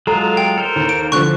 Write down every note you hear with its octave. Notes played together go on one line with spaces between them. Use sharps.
F#3 G#3 F4 A4 A#5
G5
A4 A#4 C5
D#2
D7
D3 F3 C#6 F#6